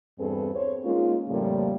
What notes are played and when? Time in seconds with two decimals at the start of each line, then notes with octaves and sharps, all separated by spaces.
0.19 E2 G2 C4 G#4 A4 B4
0.54 C5 C#5
0.84 G#3 A#3 C#4 D#4 F4
1.29 F2 A2 C#3 F3 G3 A#3